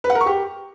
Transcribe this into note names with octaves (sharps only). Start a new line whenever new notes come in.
B4
F#5
A#4
C#6
G4